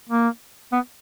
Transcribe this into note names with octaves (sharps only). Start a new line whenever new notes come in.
A#3
B3